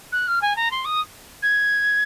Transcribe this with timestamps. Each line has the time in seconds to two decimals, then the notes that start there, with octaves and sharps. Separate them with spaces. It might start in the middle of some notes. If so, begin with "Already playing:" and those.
0.12 F#6
0.28 F6
0.42 G#5
0.56 A#5
0.71 C6
0.85 D#6
1.42 G#6